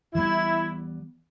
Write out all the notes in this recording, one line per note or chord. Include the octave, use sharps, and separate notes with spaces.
E3 G3 B3 E4